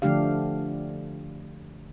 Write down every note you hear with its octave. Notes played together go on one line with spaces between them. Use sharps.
D3 F3 A3 D4 G4 F5